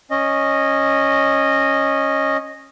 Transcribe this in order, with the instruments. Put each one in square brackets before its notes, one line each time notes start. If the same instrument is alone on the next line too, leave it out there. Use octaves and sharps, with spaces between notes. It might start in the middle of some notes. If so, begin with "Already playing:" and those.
[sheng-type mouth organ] C#4 D#5